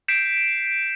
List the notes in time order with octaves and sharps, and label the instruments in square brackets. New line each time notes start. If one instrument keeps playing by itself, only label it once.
[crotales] G6 B6 C7 D7 E7